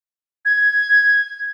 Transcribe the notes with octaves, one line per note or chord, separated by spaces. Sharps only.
G#6